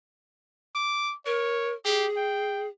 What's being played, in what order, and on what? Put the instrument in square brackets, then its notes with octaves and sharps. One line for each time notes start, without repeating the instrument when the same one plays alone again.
[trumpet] D6
[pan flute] A#4 [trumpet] C#5
[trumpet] G4 [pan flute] G#4
[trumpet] G5